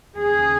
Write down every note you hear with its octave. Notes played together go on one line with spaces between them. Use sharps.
D#2 C#3 G#4